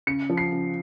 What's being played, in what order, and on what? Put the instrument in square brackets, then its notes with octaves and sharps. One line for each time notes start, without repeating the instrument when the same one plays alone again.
[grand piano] C#3 C#7
F3
C7
C#3